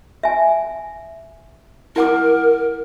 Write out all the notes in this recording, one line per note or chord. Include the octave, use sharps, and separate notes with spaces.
E5 G#5
E4 A#4 F#5 D6